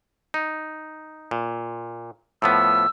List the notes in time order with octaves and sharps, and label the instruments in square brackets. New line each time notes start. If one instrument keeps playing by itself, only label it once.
[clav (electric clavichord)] D#4
A#2
[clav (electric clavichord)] A2 F3 B3 [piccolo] E6